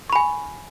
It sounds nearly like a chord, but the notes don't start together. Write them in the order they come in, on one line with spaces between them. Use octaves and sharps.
C#6 B5 G#5